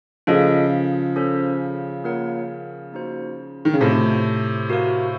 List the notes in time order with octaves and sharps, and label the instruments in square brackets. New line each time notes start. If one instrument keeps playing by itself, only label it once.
[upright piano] C#3 F3 [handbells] F4 A4 D#5
[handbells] C#4 A4 C5
A#3 F4 A#4 C#5 F#5
A#3 D#4 F#4 C5
[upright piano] D#3
C#3
[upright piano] A2 C3 [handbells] F4 C5 D#5 A5
[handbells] F#4 A#4 F5